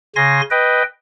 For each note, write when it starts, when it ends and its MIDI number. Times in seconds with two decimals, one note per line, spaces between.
0.16 0.41 49
0.16 0.41 80
0.16 0.41 84
0.16 0.41 94
0.51 0.83 71
0.51 0.83 75
0.51 0.83 79